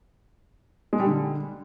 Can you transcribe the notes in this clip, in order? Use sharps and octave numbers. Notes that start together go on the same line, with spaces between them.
G#3
G3
D3